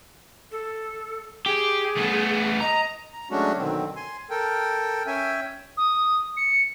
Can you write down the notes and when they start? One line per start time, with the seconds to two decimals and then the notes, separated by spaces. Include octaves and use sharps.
0.52 A4
1.46 G4 G#4
1.97 A3 B3
2.61 D#5 A#5
3.13 A#5
3.31 F#3 G#3 A3 C#4 D4 F#4
3.58 B2 D3 D#3 F#3 C4
3.96 G#5 C6
4.30 A4 A#4 G5
5.07 C#4 E5 G5 G#5
5.77 D#6
6.36 C#7